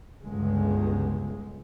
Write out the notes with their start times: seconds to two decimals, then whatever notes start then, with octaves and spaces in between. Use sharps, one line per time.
0.23 G1 C#2 G#3